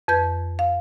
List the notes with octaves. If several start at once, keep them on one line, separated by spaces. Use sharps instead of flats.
F2 B4 G6 G#6
F5